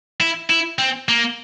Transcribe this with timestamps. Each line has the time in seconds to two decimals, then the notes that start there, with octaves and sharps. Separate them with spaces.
0.20 E4
0.50 E4
0.79 C4
1.09 A#3